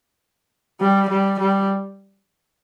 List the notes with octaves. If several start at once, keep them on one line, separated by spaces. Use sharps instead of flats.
G3
G3
G3